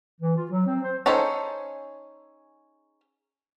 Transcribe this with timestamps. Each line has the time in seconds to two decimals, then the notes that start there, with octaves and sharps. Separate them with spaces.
0.21 E3
0.37 F4
0.51 F#3
0.66 C4
0.82 C5
1.06 C#4 D#4 G#4 A4 C5